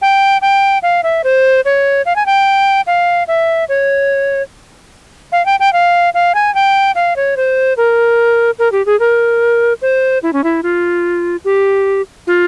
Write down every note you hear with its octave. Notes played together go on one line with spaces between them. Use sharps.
G5
G5
F5
E5
C5
C#5
F5
G#5
G5
F5
E5
C#5
F5
G5
G5
F5
F5
G#5
G5
F5
C#5
C5
A#4
A#4
G4
G#4
A#4
C5
E4
C#4
E4
F4
G4
F4